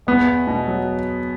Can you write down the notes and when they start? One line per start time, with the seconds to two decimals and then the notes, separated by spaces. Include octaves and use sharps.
0.07 E2 B3
0.27 E2
0.47 B2
0.67 F#3